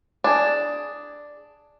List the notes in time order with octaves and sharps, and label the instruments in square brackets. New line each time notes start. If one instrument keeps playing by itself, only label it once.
[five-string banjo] D4 G#4